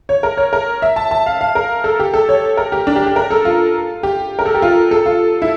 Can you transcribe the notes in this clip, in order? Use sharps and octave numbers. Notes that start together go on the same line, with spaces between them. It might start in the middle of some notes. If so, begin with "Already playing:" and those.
C#5
A#4
C#5
A#4
E5
A5
A5
F5
F5
A#4
A4
G4
A4
C#5
A#4
G4
D4
G4
G4
A#4
A4
F4
G4
A#4
A4
G4
F4
A4
F4
E4